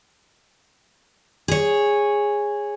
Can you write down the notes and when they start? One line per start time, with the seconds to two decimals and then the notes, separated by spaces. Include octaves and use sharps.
1.48 G#4 C#5